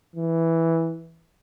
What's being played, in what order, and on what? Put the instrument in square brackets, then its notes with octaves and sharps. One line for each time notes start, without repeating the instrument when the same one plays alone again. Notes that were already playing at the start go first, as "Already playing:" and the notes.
[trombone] E3